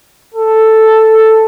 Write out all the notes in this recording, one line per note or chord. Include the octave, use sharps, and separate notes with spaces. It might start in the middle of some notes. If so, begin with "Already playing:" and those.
A4